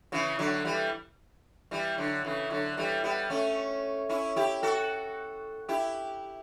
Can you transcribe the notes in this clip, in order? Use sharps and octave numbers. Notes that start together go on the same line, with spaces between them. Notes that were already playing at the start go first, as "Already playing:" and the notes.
C#3 E3
D3 F#3
E3 G3
E3 G3
D3 F#3
C#3 E3
D3 F#3
E3 G3
G3 B3
A3 C#4
C#4 E4
E4 G4
F#4 A4
E4 G4